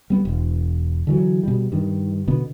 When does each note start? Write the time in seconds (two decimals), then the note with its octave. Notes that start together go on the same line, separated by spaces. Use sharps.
0.10 G3 B3
0.25 E1
1.07 D3 E3 F#3
1.43 B2 G3
1.72 G2 D#3
2.27 B2 D3 B3